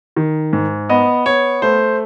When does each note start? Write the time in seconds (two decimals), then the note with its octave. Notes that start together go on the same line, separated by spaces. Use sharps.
0.16 D#3
0.53 G#2
0.89 B3 D#5
1.26 B3 C#5
1.62 A3 C5